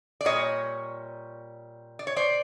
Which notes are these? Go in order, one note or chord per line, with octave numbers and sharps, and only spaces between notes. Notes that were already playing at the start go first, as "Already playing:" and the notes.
D5
A#2 G3 C#5 D#5
D5
C#5
C5 D5